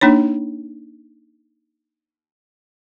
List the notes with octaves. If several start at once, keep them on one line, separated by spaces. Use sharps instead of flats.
A#3 D4 D#4 C#5